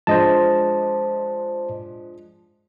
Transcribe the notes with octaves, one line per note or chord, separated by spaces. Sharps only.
F3 G#3 D4 C5 D#5 A5